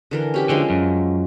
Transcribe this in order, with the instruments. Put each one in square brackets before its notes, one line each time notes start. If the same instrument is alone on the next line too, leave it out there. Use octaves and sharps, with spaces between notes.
[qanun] D3 E3 A#4
C#4 G4 E5
[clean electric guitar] D3 [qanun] F3 G#3 C#4
[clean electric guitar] F#2